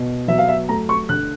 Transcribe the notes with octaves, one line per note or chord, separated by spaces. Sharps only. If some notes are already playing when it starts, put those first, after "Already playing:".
Already playing: B2
F#3 E5
F5
E5
A3 A#5
C#6
D3 F#6